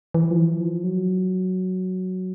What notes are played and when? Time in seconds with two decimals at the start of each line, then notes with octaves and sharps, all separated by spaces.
0.14 E3
0.31 F3
0.37 E3
0.60 F3
0.84 F#3